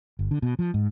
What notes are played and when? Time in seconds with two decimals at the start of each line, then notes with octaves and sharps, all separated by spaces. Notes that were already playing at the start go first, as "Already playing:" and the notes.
0.19 G1
0.31 D3
0.42 B2
0.59 F3
0.74 G#2